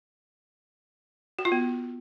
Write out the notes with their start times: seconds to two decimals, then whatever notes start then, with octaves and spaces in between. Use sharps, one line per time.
1.39 F#4
1.45 F4
1.52 B3